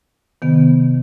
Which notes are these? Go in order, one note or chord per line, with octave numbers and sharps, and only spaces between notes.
C3 D#3 B3